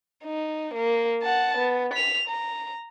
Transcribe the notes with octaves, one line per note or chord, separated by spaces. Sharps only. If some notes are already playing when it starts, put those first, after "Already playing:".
D#4
A#3
F#5 A5
B3
B6 F7
A#5